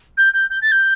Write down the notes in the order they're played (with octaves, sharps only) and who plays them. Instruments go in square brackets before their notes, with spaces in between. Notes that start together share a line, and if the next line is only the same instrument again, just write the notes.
[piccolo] G6
G6
G6
A6
G6